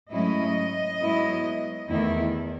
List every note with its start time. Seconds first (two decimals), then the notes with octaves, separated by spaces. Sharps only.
0.12 G#2 F#3 A3 C#4 E4 D#5
1.01 G#2 F#3 B3 E4
1.89 E2 D#3 A3 E4